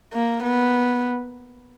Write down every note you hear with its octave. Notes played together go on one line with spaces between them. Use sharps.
A#3
B3